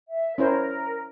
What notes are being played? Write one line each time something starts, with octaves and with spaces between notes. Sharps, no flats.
E5
C#4 E4 A#4 C5